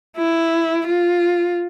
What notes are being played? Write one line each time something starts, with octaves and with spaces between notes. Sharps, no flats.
E4
F4